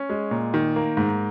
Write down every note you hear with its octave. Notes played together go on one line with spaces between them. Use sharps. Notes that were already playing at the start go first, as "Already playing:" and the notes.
Already playing: C#4
G#3
A#2
D#3
A#3
G#2